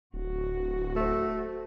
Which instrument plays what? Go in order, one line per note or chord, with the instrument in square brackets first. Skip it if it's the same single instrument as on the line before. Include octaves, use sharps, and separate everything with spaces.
[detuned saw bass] D1 [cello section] F#4
[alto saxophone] A3 [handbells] A4 C5